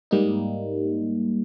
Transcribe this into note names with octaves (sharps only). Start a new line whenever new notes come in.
G#2 G3 A#3 D#4